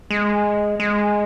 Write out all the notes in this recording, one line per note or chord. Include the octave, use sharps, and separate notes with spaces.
G#3
G#3